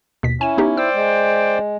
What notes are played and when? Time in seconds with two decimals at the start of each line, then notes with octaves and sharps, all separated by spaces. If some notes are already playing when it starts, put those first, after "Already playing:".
0.23 D#2 B2 B6
0.41 C#4 E4 G#5 E7
0.58 B3 D#4 G4
0.77 C5 D5 G5 E6
0.94 G#3